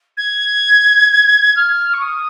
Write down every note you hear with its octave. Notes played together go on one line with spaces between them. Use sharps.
G#6
F6
C#6
D#6